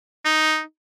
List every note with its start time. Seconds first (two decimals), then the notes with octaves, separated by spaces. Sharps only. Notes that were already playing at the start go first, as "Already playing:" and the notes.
0.25 D#4